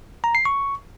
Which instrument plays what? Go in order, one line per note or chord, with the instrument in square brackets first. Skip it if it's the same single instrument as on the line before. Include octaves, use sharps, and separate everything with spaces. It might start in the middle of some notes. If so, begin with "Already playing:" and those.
[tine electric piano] A#5
C7
C#6